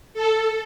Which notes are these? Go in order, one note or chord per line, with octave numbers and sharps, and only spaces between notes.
A4